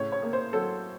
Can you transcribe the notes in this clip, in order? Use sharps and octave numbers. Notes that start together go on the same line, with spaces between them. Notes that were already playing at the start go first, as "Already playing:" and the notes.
Already playing: A2 C#3 C#5
C#5
A#3
C5
F#3 A4